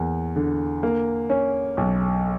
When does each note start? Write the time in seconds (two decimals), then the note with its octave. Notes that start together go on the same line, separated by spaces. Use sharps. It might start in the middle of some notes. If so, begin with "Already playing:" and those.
Already playing: E2 A#3
0.36 D3
0.83 A#3
1.30 C#4
1.77 B1